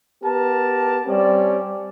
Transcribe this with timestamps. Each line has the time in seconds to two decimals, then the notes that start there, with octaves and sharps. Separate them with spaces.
0.23 B3 G4 A#4 A5
1.07 G3 C4 C#4 D5